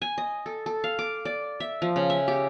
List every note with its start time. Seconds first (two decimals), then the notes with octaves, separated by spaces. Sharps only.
0.02 G#5
0.18 D#5
0.46 A4
0.66 A4
0.84 F5
0.99 D6
1.25 D5
1.60 E5
1.82 F3
1.96 C#3
2.10 E5
2.28 G4